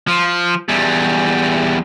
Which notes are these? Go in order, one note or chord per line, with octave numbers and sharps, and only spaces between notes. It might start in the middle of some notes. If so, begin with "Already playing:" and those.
F3
E2 G3